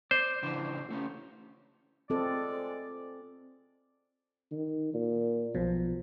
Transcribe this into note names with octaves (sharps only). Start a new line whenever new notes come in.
C5 D5
C#3 E3 D4
A3 C#4
G#3 C4 F4 A4 D5
D#3
A#2
B1 B2 F3